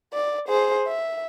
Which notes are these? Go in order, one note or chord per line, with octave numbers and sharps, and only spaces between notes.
D5
G#4 C5
E5